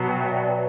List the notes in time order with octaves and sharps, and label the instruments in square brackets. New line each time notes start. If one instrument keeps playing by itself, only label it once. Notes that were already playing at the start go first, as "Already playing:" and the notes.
Already playing: [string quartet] B2 F#3 B3 [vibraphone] A5
[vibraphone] G5
E5
C#5
D5
B4